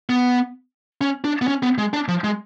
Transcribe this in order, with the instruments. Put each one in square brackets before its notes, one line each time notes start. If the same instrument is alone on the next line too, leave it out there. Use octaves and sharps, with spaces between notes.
[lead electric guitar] B3
C#4
D4
B3
C#4
B3
G#3
D4
F3
G#3